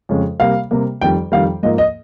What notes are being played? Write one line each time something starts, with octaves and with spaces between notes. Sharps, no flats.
F2 C#3 G#3
C3 G3 A#3 F5
C3 G3 A#3
F2 D#3 G3 G5
F2 D#3 G3 F5
G#2 F3 A#3 D#5
D#5